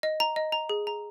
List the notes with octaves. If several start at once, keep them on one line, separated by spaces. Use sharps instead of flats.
D#5
A#5
D#5
A#5
G#4
A#5